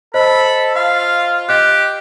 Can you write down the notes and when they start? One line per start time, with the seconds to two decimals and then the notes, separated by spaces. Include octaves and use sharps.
0.14 A4 C5 D#5 B5
0.76 F4 F5
1.49 G4 D#5 F#6